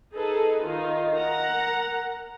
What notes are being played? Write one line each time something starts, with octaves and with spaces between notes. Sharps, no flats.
D#4 G#4 A4 B4
D#3 D#4 F4
A#4 F#5 A#5